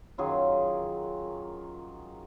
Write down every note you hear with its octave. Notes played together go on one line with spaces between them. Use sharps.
F#2 D#3 F#3 F4 G#4